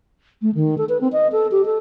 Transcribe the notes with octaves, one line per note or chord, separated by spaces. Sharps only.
A3
D#3
A4
B4
C4
D#5
A4
G4
A4